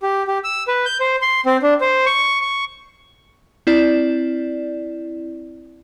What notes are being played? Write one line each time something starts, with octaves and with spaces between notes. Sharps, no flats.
G4
G4
E6
B4
G6
C5
C6
C4
D4
C5
C#6
C#6
C4 E4 D5